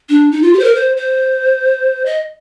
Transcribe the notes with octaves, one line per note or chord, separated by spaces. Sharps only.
D4
D#4
F4
G4
C5
A#4
C5
C5
D#5